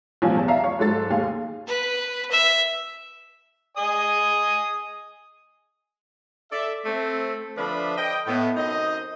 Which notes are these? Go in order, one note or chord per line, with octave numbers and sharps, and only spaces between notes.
B1 F3 G3 C#4 F5 G#5
E2 A5
D5 E5 F5 A#5 C7
C#5 F5 C#6
G#2 F#3 A4 A6
D#2 G#4 F5
B4
E5
D#5 G#5 D#6
A4 D5 E5
A3 C4
D3 F3 D4 B4 E5 B5
D#5 G5
A2 B3
F#2 C4 D#4 D#5